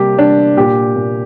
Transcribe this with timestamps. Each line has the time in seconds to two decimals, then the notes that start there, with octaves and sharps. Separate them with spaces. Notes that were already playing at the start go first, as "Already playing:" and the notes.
Already playing: C3 G3 A#3 G4
0.18 G3 D4
0.57 A#2 G4
0.96 A#2